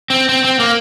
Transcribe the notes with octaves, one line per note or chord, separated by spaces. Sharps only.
C4
C4
C4
A#3